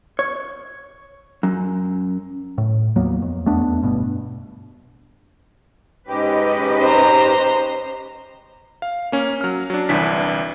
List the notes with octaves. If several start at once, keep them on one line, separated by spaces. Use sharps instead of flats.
C#5
F#2
A2
D#2 F#3 A#3 B3
F2
E2 A3 B3 D4
G1 G2 B2
G#2 C#4 G4 B4 D#5
C5 A#5
F5
A#3 C#4
F#3 F6
F#3 D4
G1 C2 E3 D4 B6